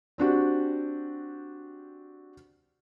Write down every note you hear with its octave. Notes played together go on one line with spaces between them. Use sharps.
C4 D4 F#4 G4